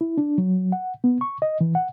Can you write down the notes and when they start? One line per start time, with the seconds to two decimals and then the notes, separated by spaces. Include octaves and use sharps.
0.01 E4
0.18 D4
0.38 F#3
0.72 F#5
1.04 B3
1.21 C#6
1.42 D#5
1.61 E3
1.75 F#5